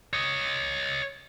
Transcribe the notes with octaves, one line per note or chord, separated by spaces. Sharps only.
C#5 D#5